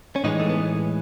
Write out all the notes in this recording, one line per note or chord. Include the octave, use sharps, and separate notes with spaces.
C#4
A2 E3 G#3 D#4
A3
B3